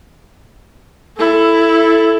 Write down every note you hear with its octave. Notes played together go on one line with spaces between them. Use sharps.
E4 A4